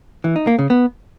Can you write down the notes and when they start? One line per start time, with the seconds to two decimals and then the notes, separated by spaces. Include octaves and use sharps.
0.24 E3
0.36 D#4
0.47 A#3
0.59 C#3
0.70 B3